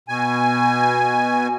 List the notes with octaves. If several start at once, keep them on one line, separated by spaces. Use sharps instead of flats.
B2 G#5